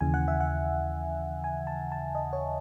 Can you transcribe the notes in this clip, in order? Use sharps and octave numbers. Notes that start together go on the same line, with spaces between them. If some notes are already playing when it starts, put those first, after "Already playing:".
D#2 C#3 E3 G#5
F#5
E5
F#5
G#5
A5
A5
D#5
C#5